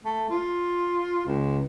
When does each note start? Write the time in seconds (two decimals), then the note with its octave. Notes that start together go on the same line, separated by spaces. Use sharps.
0.05 A3
0.30 F4
1.26 C#2